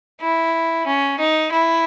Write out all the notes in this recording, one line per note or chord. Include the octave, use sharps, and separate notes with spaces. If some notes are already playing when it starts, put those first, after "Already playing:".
E4
C#4
D#4
E4